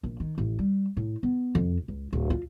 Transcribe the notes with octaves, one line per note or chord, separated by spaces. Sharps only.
A#1
D#3
A1
G3
A2
B3
F2
C#2
D1
F4